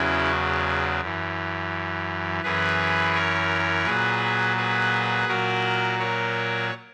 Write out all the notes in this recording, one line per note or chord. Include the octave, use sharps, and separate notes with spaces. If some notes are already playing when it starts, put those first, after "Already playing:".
Already playing: E2 C#3 F#3 C#4 E4
F#2 E3
F#2 E3 G#4 B4
A#4 C#5
A#2 F#3 G#4 B4
G#4 B4
A#2 F#3 F#4 A#4
A#4 C#5